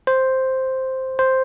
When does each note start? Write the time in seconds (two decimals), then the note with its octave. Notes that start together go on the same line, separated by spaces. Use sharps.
0.07 C5
1.19 C5